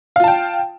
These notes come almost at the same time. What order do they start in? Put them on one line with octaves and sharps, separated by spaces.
F5 F4 A5 G5